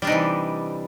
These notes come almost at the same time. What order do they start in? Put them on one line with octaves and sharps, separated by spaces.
G3 D4 D#4 C3 E3